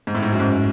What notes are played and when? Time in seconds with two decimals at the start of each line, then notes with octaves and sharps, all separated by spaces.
0.07 G#2
0.15 A2
0.23 G#2
0.32 F#2
0.40 G#2